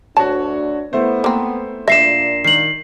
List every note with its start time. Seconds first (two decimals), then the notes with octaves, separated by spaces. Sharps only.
0.17 D2 D4 F#4 C#5 A5
0.93 A3 B3 E4 C5
1.24 A#3 C4
1.88 A#2 D4 D5 E5 A#6 C7 E7
2.45 D#3 C7 F#7